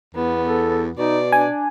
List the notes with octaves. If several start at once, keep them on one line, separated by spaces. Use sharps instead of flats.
E2 B3
A4
B2 D#4 D5
D4 G#5